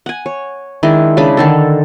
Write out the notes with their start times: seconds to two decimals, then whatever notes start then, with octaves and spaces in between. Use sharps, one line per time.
0.06 F#5 G#5
0.26 C#5
0.83 D#3 G#3 D4 E4
1.17 C#3 G#3 D4 B5
1.37 D3 D#3 A4